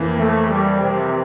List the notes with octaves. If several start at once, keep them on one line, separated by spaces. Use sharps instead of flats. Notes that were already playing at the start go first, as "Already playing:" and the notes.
Already playing: F2 E3 A#3
A3
G3
C3